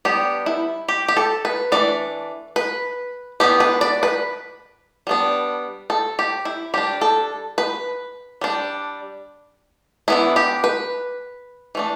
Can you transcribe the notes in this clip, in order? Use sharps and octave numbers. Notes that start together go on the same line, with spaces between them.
G3 B3 D4 G4
E4
G4
G4
A4
B4
E3 A3 D4 D5
B4
E3 B3 D4 G4
B4
D5
B4
G3 B3 D4
A4
G4
E4
G3 D4 G4
A4
B4
G3 D4
E3 B3 D4 E4
G4
B4
E3 A3 D4